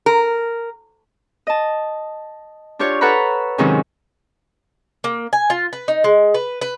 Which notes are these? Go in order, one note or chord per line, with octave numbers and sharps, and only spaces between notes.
A#4
D#5 A5
D4 F4 G4 C#5
A4 B4 C#5 F#5 A#5 B5
G#2 C3 D#3 F#3 C#4 D#4
A#3
G#5
F4
B4
D#4
G#3
B4
B4